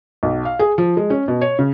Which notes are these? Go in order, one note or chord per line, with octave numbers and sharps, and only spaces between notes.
B1
F5
G#4
F3
G#3
C#4
B2
C#5
C#3